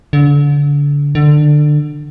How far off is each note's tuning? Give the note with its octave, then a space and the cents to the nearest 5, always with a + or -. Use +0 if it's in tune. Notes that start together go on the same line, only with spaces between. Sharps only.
D3 -30
D3 +20